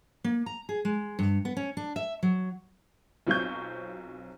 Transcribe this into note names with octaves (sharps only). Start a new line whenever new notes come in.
A#3
A#5
G#4
G#3
G2
B3
C#4
D4
E5
F#3
B1 F#3 C4 F4 C#6 G6